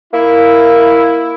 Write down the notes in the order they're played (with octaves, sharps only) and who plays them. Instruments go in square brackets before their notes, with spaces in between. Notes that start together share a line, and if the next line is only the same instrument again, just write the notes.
[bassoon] A#3 [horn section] E4